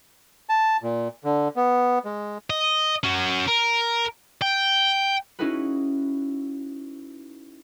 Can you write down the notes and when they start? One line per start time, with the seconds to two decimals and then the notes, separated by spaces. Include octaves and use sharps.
0.49 A5
0.83 A#2
1.24 D3
1.56 B3
2.05 G#3
2.50 D#5
3.04 C#4 F#4
3.48 A#4
4.42 G5
5.39 C#4 D#4 E4 F#4 G#4 B4